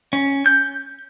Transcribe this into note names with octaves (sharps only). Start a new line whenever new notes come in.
C#4
G6